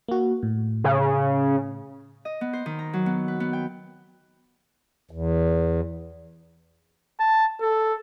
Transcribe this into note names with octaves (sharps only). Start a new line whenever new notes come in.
A#3 F#4
A2
C#3
D#5
B3
C5
D#3
A#5
F#3
B3
B4
B3
G5
E2
A5
A4